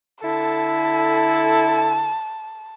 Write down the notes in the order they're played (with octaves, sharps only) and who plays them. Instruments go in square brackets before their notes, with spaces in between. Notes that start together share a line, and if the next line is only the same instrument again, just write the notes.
[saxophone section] D3 E4 A4 [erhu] A5